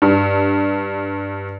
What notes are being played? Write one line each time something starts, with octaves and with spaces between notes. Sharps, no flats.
G2